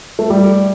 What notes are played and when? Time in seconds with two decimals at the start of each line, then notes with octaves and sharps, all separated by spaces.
0.19 A3
0.30 G3